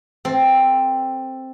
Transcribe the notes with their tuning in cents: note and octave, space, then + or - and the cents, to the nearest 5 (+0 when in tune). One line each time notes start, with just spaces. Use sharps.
C4 +5 A4 +0